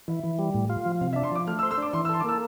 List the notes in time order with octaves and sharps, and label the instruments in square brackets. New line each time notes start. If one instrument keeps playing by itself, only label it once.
[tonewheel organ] E3 [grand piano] E5
[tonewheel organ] E3
G3
A2
F4
F3
[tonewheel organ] C3 [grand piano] F5
[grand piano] E5
[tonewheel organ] D4
[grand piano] C6
[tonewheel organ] F3 [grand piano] D6
[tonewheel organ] A3 [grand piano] F6
[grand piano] E6
[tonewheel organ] C5
[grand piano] E6
[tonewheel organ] D4 [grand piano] D6
[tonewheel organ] E3 [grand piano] C6
[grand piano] E6
[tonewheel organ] A4 [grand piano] C6
[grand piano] D6
[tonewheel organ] A#3 [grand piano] E6